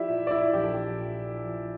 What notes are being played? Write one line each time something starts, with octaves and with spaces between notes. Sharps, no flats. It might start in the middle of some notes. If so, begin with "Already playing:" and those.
Already playing: F3 E4 G4 D5 E5
A#2
D5
E4 E5
A#1 G4
A4
G4
A#2
F3